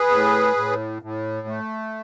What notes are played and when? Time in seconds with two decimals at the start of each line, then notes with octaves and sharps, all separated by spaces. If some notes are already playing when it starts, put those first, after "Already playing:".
Already playing: G#4 B4
0.11 A2
0.56 A2
1.02 A2
1.47 A3